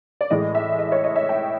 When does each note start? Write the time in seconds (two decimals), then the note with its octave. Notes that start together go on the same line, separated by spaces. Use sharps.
0.21 D5
0.30 A2 E3 G#3 D#5
0.55 E5
0.79 D#5
0.92 C#5
1.04 D#5
1.16 E5
1.29 G5